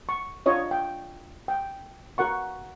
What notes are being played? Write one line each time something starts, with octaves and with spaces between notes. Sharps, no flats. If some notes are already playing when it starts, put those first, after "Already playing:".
C#6
D4 F4 C#5 D#5
G5
G5
F#4 A#4 F#5 C#6